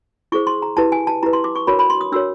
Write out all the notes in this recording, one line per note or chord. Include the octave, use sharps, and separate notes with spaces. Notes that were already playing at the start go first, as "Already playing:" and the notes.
E4 G#4 C5 C#6
C6
A#5
E4 G4 B4 A5
G#5
A5
E4 G4 B4 A#5
C6
D6
C#6
D4 F#4 A#4 C#5 B5
B5
C6
D#6
D4 F#4 A#4 C#5 E6